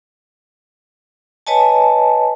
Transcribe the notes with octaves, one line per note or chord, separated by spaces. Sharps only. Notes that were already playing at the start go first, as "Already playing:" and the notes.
B4 C#5 D#5 G#5 A5